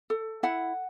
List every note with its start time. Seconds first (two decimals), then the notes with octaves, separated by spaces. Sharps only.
0.10 A4
0.43 E4 F#5